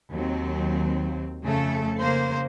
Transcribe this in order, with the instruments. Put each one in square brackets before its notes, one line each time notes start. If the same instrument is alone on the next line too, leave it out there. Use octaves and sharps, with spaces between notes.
[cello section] D#2 F#3 C4
F2 C#3 A3 A4
C#3 A#3 C5